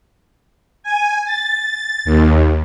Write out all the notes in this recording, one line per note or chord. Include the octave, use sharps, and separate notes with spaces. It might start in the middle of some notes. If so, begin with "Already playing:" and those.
G#5
A6
D#2